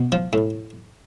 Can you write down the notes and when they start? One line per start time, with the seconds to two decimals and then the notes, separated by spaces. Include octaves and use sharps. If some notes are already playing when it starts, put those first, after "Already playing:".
Already playing: B2
0.12 F3
0.33 A2